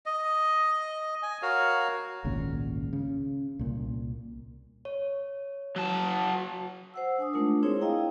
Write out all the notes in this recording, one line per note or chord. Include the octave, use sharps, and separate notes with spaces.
D#5
G#5
F#4 A#4 C#5 F5
G#1 C#2 A#2 C#3
C#3
C2 A#2
C#5
F#3 A5
C5 F#5 E6
D4 G#5 D#6
G#3 A3 D4 D#4 F4 A#4
C4 D#4 E4 G#4 C5 C#5
E4 D#5 F5 G5 A#5